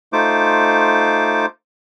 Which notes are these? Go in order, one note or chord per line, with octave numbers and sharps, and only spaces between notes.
A3 D#4 F4 C5 D6